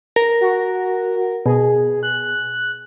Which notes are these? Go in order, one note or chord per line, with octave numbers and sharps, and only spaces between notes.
A#4
F#4
B2 G#4
F#6